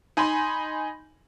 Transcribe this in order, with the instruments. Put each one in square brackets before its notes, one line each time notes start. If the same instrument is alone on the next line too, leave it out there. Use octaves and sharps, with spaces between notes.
[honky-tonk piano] D#4 G#5 B5 C6